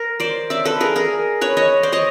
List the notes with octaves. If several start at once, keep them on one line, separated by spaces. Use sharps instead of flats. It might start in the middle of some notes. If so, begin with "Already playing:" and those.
Already playing: A#4
C5 D5
D5 E5
A4 B4
G#4 A#4
G#4 A#4
B4 C#5
C#5 D#5
C5 D5
C#5 D#5